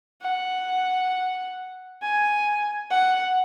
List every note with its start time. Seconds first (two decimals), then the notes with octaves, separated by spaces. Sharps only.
0.22 F#5
2.02 G#5
2.91 F#5